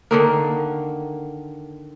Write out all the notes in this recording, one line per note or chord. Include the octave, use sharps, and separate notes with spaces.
D3 D#3 A#3